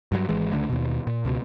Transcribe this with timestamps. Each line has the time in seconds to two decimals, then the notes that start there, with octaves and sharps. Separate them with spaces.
0.12 G2 F3 F#3
0.29 G#1 E3 G#3
0.52 C#2 D3 A3
0.69 D#2 B2
1.07 A#2
1.25 C#2 B2